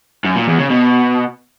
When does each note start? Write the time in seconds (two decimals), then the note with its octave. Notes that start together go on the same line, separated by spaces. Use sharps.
0.25 F#2
0.36 A#2
0.47 E2
0.59 C#3
0.70 B2